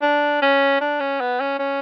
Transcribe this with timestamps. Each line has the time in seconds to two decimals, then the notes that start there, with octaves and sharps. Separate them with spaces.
0.02 D4
0.42 C#4
0.81 D4
1.00 C#4
1.20 B3
1.40 C#4
1.59 C#4